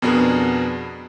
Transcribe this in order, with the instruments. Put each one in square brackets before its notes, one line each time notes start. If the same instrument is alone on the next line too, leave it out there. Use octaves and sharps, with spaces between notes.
[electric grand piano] F2 B2 B3 D4 G#4 A#4